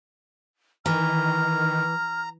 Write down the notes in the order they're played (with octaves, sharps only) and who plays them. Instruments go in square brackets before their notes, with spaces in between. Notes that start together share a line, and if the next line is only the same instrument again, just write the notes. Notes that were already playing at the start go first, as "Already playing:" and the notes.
[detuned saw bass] D#3 [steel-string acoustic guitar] E3 [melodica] A#5 [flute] F6